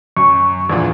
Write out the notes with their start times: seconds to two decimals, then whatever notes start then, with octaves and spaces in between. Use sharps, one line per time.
0.17 F#2 C#6
0.70 A#1 E2 A#2